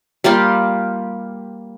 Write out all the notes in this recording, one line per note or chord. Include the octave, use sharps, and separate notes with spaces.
G3 A#3 F4 G4